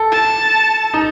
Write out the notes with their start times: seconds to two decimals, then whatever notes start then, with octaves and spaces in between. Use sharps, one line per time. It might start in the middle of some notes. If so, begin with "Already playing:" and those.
Already playing: A4
0.12 A5
0.94 D#4